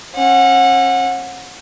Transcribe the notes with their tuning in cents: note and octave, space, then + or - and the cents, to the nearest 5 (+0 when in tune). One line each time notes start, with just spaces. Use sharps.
C#4 -45 F#5 -25